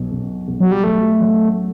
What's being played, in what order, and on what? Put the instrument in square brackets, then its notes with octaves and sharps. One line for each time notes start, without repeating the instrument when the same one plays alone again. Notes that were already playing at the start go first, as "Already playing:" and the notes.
Already playing: [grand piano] B1 F#3
B1
B1
[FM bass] F#3
G3
[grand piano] F#3 [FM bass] A3
[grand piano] F#3